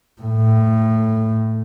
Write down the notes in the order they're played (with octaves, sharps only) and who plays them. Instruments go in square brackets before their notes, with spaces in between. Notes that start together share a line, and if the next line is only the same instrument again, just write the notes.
[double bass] A2